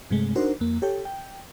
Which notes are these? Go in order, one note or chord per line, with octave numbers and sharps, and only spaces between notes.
G2 C3 G#3 A3
D4 D#4 F#4 A#4 C5
F2 A#3
G4 A4 C#5 G5
G5